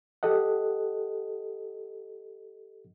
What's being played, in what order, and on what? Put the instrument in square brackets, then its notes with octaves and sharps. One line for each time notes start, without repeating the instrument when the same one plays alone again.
[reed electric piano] G4 A4 D#5 F#5